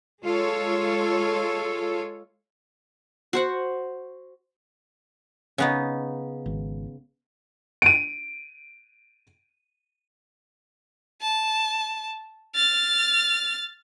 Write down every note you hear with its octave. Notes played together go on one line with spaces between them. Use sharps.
G#3 F4 A4 C#5
F#4 C5 F#5
C#3 B3 D#4
G#1
D7 D#7
A5
F6 A6